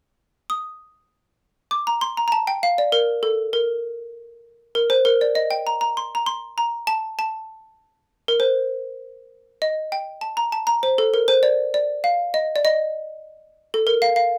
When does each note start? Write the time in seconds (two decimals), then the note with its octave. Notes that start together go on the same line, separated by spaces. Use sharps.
0.50 D#6
1.71 D6
1.87 A#5
2.01 C6
2.17 A#5
2.28 A#5
2.32 A5
2.47 G5
2.63 F5
2.78 D5
2.92 A#4
3.23 A4
3.53 A#4
4.75 A#4
4.90 C5
5.05 A#4
5.21 D5
5.35 D#5
5.51 G5
5.67 A#5
5.81 A#5
5.97 C6
6.15 A#5
6.26 C6
6.58 A#5
6.87 A5
7.19 A5
8.28 A#4
8.40 C5
9.62 D#5
9.92 G5
10.21 A5
10.37 A#5
10.52 A5
10.67 A#5
10.83 C5
10.98 A4
11.14 A#4
11.28 C5
11.43 D5
11.74 D5
12.04 F5
12.34 D#5
12.56 D5
12.65 D#5
13.74 A4
13.87 A#4
14.02 F5
14.16 F5